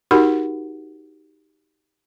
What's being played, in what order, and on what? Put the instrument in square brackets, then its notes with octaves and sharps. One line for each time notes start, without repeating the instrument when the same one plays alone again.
[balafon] D#4 F#4 G4 A#4 F#5 B5